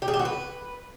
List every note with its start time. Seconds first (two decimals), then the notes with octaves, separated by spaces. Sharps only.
0.02 G4
0.08 G#4
0.14 G4
0.19 F#4
0.25 B4